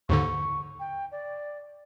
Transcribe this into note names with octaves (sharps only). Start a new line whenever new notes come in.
D#2 G#2 D3 C#6
G5
D5